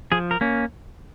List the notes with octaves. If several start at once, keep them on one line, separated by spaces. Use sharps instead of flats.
F3 G#4
A#4
A#3 C#4